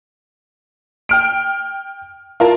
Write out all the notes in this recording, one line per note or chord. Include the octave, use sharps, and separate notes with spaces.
G5 F6 D7
F4 A#4 A5